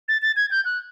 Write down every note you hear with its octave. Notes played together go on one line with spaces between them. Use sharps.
A6
A6
G#6
G6
F#6